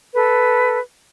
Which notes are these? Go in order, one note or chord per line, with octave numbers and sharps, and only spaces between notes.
A4 B4